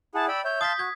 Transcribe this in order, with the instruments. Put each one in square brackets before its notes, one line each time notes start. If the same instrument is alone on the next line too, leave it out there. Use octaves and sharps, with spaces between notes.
[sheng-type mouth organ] E4 G#4 F#5 [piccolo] A5
[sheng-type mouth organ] D5 G5 B5 [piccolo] E6
[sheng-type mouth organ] C#5 E5 [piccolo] G6
[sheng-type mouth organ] F5 A5 C6 [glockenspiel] D#6 B6
[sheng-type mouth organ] F#4 [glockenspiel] G#6